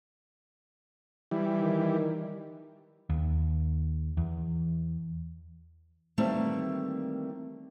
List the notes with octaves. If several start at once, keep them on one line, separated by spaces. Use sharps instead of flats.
E3 G3
D#3
D#2
E2
D#3 E3 G3 A3 A#3 C4